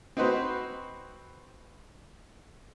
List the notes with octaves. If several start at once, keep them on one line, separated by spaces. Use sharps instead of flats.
C4 D#4 F#4 B4 C5